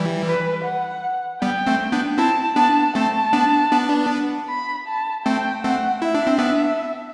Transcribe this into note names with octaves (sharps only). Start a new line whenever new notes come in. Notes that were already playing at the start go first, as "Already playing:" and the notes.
Already playing: E3 G3
B4
F#5
G3 B3 G5
A3 C4
B3 D4
C4 E4 A5
B3 D4 A5
A3 C4 A5
B3 D4
B3 D4
B5
A5
A3 C4 G5
A3 C4 F#5
E4 E5
D4
C4
B3 D4